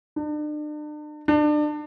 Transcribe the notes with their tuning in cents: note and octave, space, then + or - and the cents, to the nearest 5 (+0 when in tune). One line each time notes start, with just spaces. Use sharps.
D4 +40
D4 +30